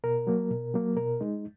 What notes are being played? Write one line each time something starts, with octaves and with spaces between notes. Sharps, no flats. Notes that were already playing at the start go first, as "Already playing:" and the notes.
B2 A#4
F#3 A#3
B2
F#3 A#3
B2 A#4
G#3 D#4